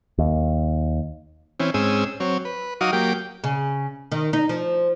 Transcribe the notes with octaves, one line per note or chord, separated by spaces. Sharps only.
D#2
E3 C4 C#4
G#2 C4 C#4 G#4 E6
F#3 C4 C#5
B4
F#3 D#4 F#4 F5 D6 D#6
F#3 A#3 G4 G5
C#3
D#3
D#4
F3